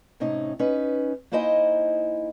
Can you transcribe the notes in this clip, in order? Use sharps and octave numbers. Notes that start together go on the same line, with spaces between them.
A2 C3 C#4 D#4
C#4 D#4 B4
A#3 D#4 E4 C5 D#5 G#5